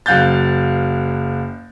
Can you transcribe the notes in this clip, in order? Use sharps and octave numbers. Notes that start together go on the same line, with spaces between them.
F#1 F#3 F5 F#6 G6 A6